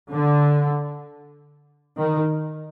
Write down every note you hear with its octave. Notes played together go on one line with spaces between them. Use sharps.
D3
D#3